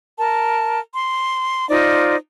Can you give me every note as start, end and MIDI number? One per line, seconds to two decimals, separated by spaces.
0.19 0.80 70
0.19 0.80 81
0.94 1.68 84
1.69 2.16 63
1.69 2.16 65
1.69 2.16 72
1.69 2.16 74